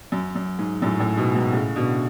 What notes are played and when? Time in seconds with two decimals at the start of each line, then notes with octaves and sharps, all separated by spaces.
0.12 F#2
0.35 F#2
0.59 G#2
0.82 F#2 A2
1.00 F#2 A2
1.17 G#2 B2
1.35 G#2 B2
1.52 A2 C#3
1.75 B2 D3